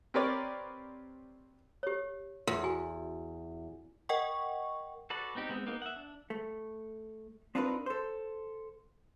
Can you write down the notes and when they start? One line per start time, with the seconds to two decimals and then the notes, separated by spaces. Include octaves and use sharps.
0.14 C4 G4 A#4 B4 C#5 D5
1.83 G4 C#5
2.47 E2 C6
2.63 F#4 G#5
4.09 A#4 D#5 F#5 G5 C#6
5.10 F#4 A4 B4 D5
5.35 B3 C4 D#4 G4
5.49 G#3 B3 C4
5.67 A#3 B3 D#4
5.82 E5 F#5
5.96 D4
6.30 A3
7.55 C4 D4 D#4 F4 A#4 B4
7.86 A4 C5